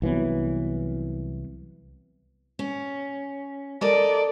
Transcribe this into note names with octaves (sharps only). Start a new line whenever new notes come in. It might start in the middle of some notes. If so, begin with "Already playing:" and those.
C2 E3 F#3 B3
C#4
A4 A#4 D5 D#5